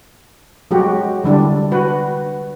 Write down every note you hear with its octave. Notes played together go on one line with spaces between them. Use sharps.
F#3 G#3 F#4 G4
D3 G3 D4 E4
F#4 B4